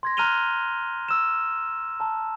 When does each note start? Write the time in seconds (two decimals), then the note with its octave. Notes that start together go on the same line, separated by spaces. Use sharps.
0.03 C6 G#6 A#6
0.17 A#5 F6 F#6 D#7 F7 G7
1.08 E6 E7
2.00 A5 A#5